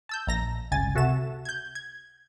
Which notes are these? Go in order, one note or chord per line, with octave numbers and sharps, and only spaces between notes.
A5 E6 G6
A#1 A#5 A#6
G1 C#2 G#5 A6
C3 F#4 A4 E5 E7
G6 G#6
G#6